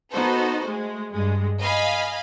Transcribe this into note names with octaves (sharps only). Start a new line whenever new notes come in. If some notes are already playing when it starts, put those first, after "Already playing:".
B3 D#4 F#4 A4 C5
G#3 A3
G2 G#3
D#5 F5 G#5 B5